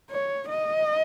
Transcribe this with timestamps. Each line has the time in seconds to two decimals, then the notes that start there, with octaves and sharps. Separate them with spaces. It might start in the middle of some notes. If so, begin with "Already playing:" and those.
0.11 C#5
0.49 D#5